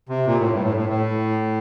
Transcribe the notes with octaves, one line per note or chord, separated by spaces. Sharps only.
C3
A#2
A2
G2
A2
A2
A2